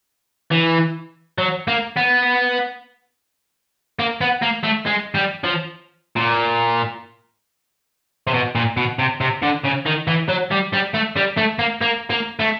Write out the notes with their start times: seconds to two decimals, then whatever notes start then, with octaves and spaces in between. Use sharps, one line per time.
0.51 E3
1.38 F#3
1.67 A#3
1.96 B3
3.99 A#3
4.21 B3
4.42 A#3
4.64 A3
4.86 G#3
5.15 G3
5.44 F3
6.17 A#2
8.27 C3
8.34 B2
8.55 A#2
8.77 B2
8.99 C3
9.21 C3
9.42 D3
9.64 C#3
9.86 D#3
10.07 E3
10.29 F#3
10.51 G3
10.73 G3
10.94 A3
11.16 G3
11.37 A3
11.59 A#3
11.81 A#3
12.10 A#3
12.39 A3